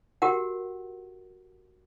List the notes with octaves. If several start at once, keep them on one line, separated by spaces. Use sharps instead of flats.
F#4 G4 A#4 F#5